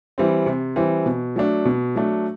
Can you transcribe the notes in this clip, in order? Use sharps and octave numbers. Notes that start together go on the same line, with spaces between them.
E3 G3 C4
C3
E3 G3 C4
B2
F#3 A3 D4
B2
F#3 A3 D4